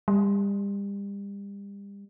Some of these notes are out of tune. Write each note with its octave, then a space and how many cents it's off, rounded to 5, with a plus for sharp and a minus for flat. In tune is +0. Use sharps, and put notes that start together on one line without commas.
G3 +35